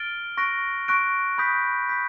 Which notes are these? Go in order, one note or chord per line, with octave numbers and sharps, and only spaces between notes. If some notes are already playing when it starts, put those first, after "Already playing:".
Already playing: F6 A6 D7 G7
C#6 F#6 A#6 D7
C#6 F#6 A#6 D7
B5 D#6 G6 B6
B5 D#6 G6 B6